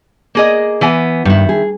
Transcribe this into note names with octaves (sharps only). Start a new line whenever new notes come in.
A#3 G#4 D#5
E3 B3 G#5
G2 D#3 E4
G#4